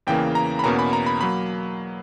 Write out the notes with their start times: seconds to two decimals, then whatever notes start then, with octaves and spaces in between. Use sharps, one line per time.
0.07 E2 C#3 E3 A#3 G5
0.35 A#5
0.59 B5
0.63 E2 B2 A#3 C#4 A#5
0.79 B5
0.93 A#5
1.06 B5
1.21 F#3 A#3 B5